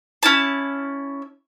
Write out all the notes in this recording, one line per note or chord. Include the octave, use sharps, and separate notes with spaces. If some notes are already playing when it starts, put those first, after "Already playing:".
C#4 E4 A5